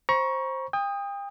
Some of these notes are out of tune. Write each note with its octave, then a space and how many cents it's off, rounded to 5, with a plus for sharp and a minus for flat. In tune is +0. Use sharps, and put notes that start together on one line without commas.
C5 +15 A#5 +35 C#6 +0
G5 +35 D#6 +0